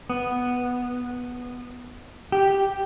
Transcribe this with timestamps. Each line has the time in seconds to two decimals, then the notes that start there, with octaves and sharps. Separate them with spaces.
0.10 B3
2.32 G4